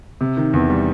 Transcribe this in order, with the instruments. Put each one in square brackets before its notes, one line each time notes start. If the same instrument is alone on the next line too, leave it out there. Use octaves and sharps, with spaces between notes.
[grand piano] C3
D#3
E2
G3